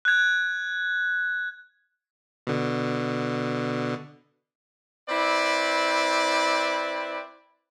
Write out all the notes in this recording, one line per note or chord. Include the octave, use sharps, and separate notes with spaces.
F#6 G#6
B2 D3
C4 E4 B4 D5